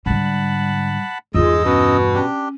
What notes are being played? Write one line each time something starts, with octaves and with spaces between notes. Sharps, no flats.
G#2 D3 G3 F#5 A5 B5
E2 G2 G#3 D#4 F4 D#5 E6
B2 C#4
C#4 D4 G4